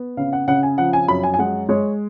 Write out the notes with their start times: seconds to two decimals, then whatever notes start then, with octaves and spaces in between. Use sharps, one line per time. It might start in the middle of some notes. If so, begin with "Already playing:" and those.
Already playing: B3
0.17 C#3 F5
0.33 F#5
0.48 C#3 F#5
0.63 G#5
0.78 F3 F#5
0.93 G#5
1.08 F#2 B5
1.23 G#5
1.34 G#5
1.39 G#3 F#5
1.69 G#3 C#5